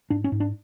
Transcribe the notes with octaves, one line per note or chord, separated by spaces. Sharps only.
G#2 D4
C#4
G#2
D4